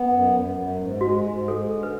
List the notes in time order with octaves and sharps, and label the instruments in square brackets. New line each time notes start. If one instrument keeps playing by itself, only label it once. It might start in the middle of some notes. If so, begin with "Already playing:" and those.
Already playing: [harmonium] B3
F#2
F#2
F#2
G#2
[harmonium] G#3 [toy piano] F#4
[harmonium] G#2
[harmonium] G#3 [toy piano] A4
[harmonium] D3
[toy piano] B4